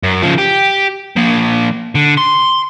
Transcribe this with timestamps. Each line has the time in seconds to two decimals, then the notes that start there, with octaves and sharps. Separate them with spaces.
0.03 F#2
0.23 C#3 F3
0.38 G4
1.16 F3 A#3
1.95 D3
2.17 C6